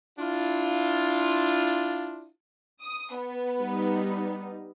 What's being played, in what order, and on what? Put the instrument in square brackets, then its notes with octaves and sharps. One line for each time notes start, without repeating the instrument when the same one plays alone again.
[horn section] D4 E4 F4
[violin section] D#6
B3
[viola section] G3 D#4